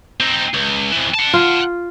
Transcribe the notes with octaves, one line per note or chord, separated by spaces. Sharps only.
C4 D#4
C#2
F2 E3
F#5 A5
F4